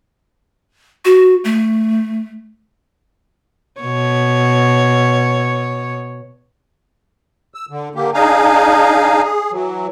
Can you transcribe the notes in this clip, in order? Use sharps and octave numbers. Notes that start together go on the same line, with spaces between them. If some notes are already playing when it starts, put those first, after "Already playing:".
F#4
A3
B2 C#5
E6
D3
D3 A#3 G4
D4 D#4 G#4 F5 G#5 A#5
G#4
E3 F#3